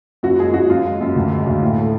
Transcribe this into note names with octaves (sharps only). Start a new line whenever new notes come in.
F#2 F#4
G#3 G#4
F#2 F#4
F#2 F4
G#3
F#2
D2
G#3
D2
A2
A3